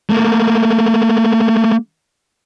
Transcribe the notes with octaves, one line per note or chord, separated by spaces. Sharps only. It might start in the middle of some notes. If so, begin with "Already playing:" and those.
A3 A#3